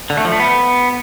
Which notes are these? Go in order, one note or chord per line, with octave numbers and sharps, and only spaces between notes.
D3
A3
F3
A3
B3